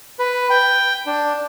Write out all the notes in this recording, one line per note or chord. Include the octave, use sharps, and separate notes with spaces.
B4
G5
D4